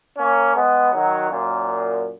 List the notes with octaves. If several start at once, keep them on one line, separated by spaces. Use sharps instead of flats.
A#3 C#4
G#3 B3
D#3 F#3
F#2 A#2